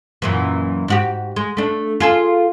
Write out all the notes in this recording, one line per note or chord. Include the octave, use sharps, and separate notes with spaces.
F#2 A#2 E3
G#2 F#4 G4
G#3
A3 D4
F4 G#4 A4